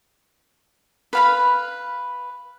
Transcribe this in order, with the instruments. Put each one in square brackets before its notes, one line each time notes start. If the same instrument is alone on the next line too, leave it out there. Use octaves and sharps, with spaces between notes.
[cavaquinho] B4 F5 B5